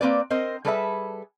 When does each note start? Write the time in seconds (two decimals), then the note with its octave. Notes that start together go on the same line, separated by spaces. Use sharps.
0.01 A#3 C4 B4 D5
0.30 C4 A#4 C5 D#5
0.65 G3 G#4 A4 B4 D5 E5